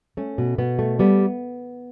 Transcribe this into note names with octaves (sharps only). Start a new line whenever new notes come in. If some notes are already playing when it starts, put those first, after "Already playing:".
A3 C#4
B2
B2 B3
A3
G3 B3